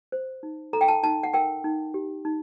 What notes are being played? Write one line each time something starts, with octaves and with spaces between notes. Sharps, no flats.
C5
D#4
A4 A#5
G5
A5
D#4 A5
F#5
A#4 G5
D#4
G4
D#4